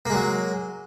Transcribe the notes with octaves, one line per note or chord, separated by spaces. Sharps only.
F#3 G#3 A#3